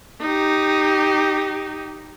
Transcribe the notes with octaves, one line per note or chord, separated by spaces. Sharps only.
D#4 G4